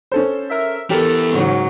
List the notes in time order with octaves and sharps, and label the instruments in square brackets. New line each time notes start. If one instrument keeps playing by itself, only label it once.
[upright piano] C#4 A4 C5
[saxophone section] A#4 E5
[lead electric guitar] E3 B3 [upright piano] G4 A#4 [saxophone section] A4
[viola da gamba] G#2 C#3 F#3